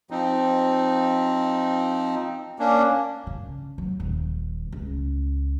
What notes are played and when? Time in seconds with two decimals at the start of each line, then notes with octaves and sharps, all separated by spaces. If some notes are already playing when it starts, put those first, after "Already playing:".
0.11 F3 C4 D#4
2.59 A#3 C#4 D4
3.27 C#3
3.78 F#3
4.00 D#1
4.72 C#2